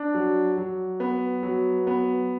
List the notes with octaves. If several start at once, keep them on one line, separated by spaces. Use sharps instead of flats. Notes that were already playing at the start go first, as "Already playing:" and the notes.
Already playing: D4
F#3
F#3
B3
F#3
B3